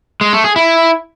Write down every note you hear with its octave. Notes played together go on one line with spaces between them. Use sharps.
G#3
A3
G#4
E4